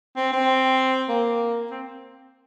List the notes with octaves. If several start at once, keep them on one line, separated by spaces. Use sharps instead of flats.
C4
C4
A#3
C4